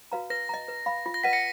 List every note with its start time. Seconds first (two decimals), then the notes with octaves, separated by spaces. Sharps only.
0.12 F#4 B4 F5 A#5
0.30 B4 A#6
0.49 D#5 A#5
0.68 B4
0.86 F5 B5
1.06 F4
1.14 A#6
1.23 B4 D#5 F#5 B6 D#7
1.33 A#6 C#7